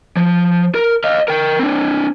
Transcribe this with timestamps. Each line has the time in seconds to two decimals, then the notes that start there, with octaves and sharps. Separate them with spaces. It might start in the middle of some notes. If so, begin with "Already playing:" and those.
0.17 F3
0.75 A#4
1.04 D#5 F5
1.28 A#4 G5
1.59 C4 D4